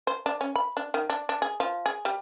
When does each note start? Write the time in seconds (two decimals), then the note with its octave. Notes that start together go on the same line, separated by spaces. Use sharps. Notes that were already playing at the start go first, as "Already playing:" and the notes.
0.07 C5
0.26 D4
0.41 C#4
0.56 B5
0.77 D4
0.94 D#3
1.10 D4
1.29 D4
1.42 G#4
1.60 F3
1.86 G#4
2.05 G3